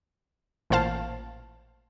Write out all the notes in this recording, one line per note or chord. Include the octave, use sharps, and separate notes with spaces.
A1 A#2 C5 F5 A5